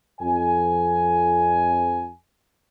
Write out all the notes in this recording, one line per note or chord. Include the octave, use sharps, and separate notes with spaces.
F2 G#5